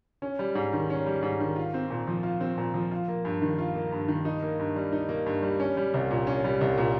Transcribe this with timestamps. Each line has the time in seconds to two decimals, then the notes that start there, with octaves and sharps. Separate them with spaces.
0.22 C#4
0.39 G3
0.55 G#2
0.73 D#3
0.90 C#4
1.06 G3
1.23 G#2
1.40 D#3
1.56 F4
1.74 C4
1.91 A#2
2.07 F3
2.23 F4
2.41 C4
2.58 A#2
2.74 F3
2.91 F4
3.08 A#3
3.25 G2
3.42 D#3
3.58 F4
3.75 A#3
3.92 G2
4.08 D#3
4.25 D#4
4.43 A#3
4.59 G2
4.76 G3
4.92 D#4
5.09 A#3
5.26 G2
5.42 G3
5.60 C#4
5.77 G3
5.94 C2
6.10 A#2
6.27 C#4
6.44 G3
6.61 C2
6.78 A#2